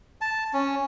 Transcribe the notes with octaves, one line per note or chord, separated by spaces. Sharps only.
A5
C#4